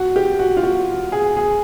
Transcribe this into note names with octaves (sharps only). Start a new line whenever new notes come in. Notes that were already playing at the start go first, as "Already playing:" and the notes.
Already playing: F#4
G4
F#4
F4
F#4
G#4
G#4